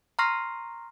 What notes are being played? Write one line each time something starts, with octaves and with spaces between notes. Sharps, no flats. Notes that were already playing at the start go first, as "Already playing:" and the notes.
A#5 C6 C#6 F6 A#6 C7